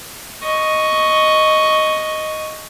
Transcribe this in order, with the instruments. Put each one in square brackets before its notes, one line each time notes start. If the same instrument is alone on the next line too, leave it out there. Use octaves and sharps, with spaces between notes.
[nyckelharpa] D#5 C#6